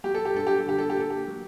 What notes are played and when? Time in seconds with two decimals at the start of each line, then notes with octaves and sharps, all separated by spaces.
0.04 F#3 G4
0.14 A4
0.25 G4
0.34 G2 A4
0.47 G4
0.58 A4
0.66 D3 G4
0.78 A4
0.90 G4
0.96 A#3 A4
1.10 G4
1.27 F#3